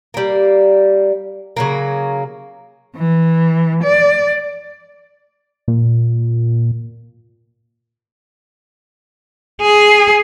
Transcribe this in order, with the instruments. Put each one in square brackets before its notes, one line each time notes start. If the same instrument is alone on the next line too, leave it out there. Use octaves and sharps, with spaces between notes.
[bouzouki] G3 A#3
C#3 F#3 A#3
[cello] E3
D5
[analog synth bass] A#2
[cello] G#4